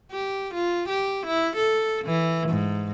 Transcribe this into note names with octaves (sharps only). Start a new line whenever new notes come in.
G4
F4
G4
E4
A4
E3
G#2